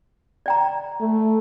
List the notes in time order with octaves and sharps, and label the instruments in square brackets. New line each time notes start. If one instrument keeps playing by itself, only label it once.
[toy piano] D5 G5 A#5
[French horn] A3